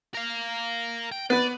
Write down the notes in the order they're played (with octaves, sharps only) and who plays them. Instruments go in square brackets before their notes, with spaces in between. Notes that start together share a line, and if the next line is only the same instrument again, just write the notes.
[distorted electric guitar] A#4 F5
G5
[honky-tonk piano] B3 B4 [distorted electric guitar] D5